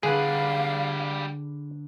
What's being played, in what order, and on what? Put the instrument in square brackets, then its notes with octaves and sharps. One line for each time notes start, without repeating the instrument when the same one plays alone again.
[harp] D3 D4 B4 [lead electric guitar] G3 F#5 [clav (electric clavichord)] G#4 [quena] F5